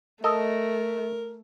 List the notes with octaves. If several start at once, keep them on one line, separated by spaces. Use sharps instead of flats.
A3 A4 A#4 D#5